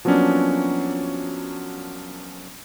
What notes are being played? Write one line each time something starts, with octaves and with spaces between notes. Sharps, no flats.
F3 F#3 A#3 B3 C#4 D4